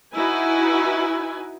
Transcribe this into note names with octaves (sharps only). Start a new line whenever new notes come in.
D#4 E4 F#4 B4 G#5